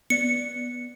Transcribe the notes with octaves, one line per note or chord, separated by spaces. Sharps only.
B3 D5 C#7